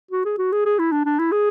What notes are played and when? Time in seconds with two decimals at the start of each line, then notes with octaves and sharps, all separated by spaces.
0.11 F#4
0.25 G#4
0.38 F#4
0.52 G#4
0.65 G#4
0.79 E4
0.92 D4
1.05 D4
1.19 E4
1.32 G#4